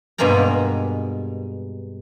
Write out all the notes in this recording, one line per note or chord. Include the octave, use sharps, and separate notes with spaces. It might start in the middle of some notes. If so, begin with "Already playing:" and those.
G2 B2 G#3 A#3 G#5 A#5